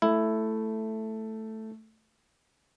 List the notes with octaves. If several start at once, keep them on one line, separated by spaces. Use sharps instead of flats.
A3 E4